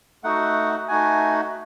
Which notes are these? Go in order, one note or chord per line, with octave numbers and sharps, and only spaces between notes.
A3 D#4 F#4 F#5
A3 D#4 F#4 G#5